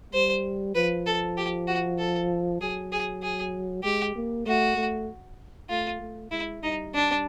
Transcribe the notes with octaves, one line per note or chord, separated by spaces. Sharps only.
G3 C5
F3 B4
A4
G4
F#4
A4
F#3 G#4
G#4
G#4
G#3 G4
A#3
A3 F#4
A3
A3 F4
A3
G#3 E4
G3 D#4
D4